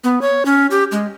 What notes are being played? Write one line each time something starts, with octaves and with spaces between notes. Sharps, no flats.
B3
C#5
C#4
G4
G#3